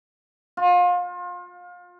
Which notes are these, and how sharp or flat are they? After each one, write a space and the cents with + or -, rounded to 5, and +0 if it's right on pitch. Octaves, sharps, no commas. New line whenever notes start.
F4 +30